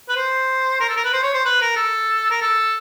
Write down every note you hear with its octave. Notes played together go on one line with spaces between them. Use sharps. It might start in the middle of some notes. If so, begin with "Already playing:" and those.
B4
C5
A#4
A4
A#4
B4
C5
C#5
C5
B4
A#4
A4
A#4
A4